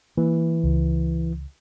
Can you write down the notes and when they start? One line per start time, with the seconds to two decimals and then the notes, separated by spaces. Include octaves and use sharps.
0.17 E3 A#3
0.64 C#2